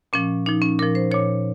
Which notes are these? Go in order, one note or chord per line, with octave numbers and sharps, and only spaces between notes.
A#2 F3 C#4
A#2 F3 D#4
C#4
A#2 F3 A#4
C5
A#2 F3 C#5